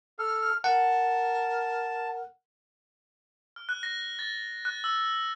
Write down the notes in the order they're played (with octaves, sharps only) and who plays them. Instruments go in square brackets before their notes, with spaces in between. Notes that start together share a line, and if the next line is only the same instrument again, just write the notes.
[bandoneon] A4 [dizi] F6
[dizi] A#4 [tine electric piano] F#5 [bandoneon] A5
[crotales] F6
F#6
A#6
A6
F#6
E6